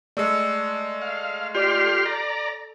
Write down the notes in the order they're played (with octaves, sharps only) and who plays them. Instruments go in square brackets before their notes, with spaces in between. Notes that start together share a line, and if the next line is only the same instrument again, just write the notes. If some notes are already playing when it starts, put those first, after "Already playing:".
[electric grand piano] G#3 A3 [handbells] D5 E6 C#7
[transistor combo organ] F5
[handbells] F4 D5 D6 [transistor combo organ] G4 C6 F6
[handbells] A4
[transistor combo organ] D5 A#5